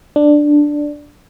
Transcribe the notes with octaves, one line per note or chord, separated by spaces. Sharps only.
D4